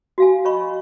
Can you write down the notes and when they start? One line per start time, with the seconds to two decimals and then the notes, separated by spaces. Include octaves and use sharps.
0.18 F#4 F5 G#5
0.45 C#5 D#5 B5 C#6